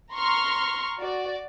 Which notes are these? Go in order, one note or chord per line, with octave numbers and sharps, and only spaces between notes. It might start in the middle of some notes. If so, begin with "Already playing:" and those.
A#5 C6 C#6 F6
F#4 D5